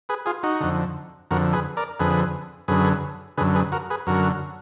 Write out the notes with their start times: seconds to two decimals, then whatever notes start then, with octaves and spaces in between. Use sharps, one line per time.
0.09 G#4 B4
0.26 F4 G#4
0.43 D#4 F#4
0.61 F2 D3
1.31 F2 D3 F#4 A#4
1.53 G#4 B4
1.77 A#4 D5
2.00 F2 D3 G#4 B4
2.68 F#2 D3 G#4 B4
3.37 D3 G#4 B4
3.41 F#2
3.55 G#4 B4
3.72 F#4 A#4
3.90 G#4 B4
4.07 F#2 D3 F#4 A#4